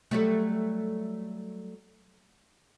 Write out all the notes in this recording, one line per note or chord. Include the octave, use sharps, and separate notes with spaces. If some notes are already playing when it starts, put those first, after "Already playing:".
F#3 G3 A3